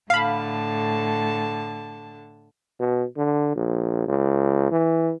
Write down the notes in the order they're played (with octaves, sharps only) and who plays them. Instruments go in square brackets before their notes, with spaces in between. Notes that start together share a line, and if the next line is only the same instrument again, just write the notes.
[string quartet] A2 D3 A5 [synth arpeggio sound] F5 B5
[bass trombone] B2
D3
A#1
C#2
E3